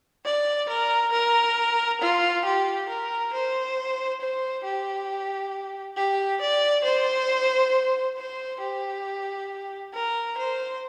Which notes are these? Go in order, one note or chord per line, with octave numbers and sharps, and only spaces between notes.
D5
A#4
A#4
F4
G4
A#4
C5
C5
G4
G4
D5
C5
C5
G4
A#4
C5